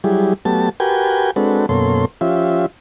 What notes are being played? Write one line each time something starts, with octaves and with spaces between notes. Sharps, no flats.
F#3 G3 E4 G4 G#4
F#3 A3 B3 G4 A5
F#4 G4 A#4 B4 G5 G#5
G#3 C4 D4 F#4 A4 B4
F#2 B2 A#3 C#4 A4 C6
F3 C#4 F4 G4 E5